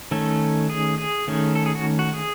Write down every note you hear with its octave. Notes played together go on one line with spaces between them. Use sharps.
D#3 A3 C#4 A4
G#4
G#4
D#3 A3 C#4
A4
G#4
F#4
F#4
G#4